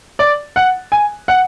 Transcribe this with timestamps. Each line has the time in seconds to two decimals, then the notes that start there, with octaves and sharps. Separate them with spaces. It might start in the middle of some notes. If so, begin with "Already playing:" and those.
0.19 D5
0.56 F#5
0.92 G#5
1.28 F#5